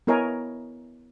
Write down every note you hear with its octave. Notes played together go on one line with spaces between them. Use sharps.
B3 E4 A#4 C#5 D#5 G#5